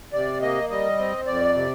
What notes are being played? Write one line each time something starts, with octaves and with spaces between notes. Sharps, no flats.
C3 D5
A#3 D#5
G3 D#5
C4
F2 D5
C3